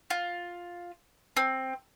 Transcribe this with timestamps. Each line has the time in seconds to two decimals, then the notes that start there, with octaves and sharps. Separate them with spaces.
0.10 F4
1.37 C4